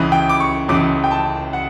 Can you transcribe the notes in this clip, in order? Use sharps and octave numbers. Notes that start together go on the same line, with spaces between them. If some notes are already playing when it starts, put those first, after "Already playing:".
Already playing: C#2 C#3 E3 B5
G5
D6
C#6
C#2 C#3 E3 D6
G5
A5
F#5